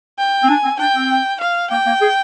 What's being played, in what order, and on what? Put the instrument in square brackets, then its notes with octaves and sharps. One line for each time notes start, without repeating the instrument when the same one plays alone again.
[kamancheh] G5
[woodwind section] C4
[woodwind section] D4 [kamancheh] G#5
[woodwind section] C4
[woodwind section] D4 [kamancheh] G5
[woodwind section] C4
[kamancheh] F5
[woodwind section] A#3 [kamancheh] G5
[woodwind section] A#3
G#4